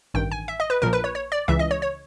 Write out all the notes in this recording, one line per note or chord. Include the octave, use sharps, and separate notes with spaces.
A1 G2 D#3 G5
G#5
E5
D#5
B4
A#1 A#2 F3 A#4
B4
C#5
C#5
D5
C#2 C#3 E3 E5
D#5
C#5
C#5